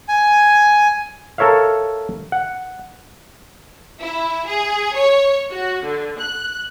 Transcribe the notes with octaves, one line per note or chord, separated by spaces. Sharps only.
G#5
A4 A#4 C#5 E5 F5
F#5
E4
G#4
C#5
F#4
D3
F#6